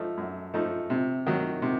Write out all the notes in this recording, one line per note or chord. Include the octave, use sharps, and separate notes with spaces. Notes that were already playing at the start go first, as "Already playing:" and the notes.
Already playing: F3 A3 D#4
F#2
F3 A3 D#4
C3
D#3 F#3
C3